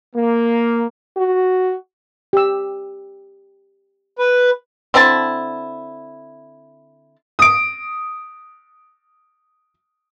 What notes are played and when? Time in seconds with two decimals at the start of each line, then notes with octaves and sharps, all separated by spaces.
0.15 A#3
1.17 F#4
2.33 G4 E6
4.19 B4
4.94 D3 C4 E4 A5
7.39 D#6 D7